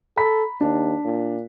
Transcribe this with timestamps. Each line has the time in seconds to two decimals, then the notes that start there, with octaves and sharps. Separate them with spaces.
0.17 A4 A#5 B5 B6
0.61 D#2 D4
1.05 A#2